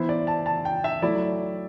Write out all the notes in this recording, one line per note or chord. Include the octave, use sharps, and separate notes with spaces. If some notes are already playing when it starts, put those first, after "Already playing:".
Already playing: E3 B3 E4 C5
D5
A5
A5
G5
E5
F#3 A3 E4 D5